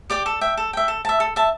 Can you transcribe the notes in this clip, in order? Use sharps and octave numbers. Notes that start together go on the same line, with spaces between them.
G4 D5 G5
A4
E5 G5
A4
E5 G5
A4
E5 A5
A4
E5 A5